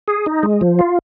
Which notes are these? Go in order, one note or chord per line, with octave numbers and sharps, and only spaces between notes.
G#4
D#4
G#3
F3
F4